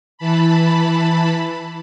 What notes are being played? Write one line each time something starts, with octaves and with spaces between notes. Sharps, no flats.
E3 A5 B5